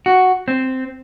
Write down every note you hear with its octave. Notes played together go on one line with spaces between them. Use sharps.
F#4
C4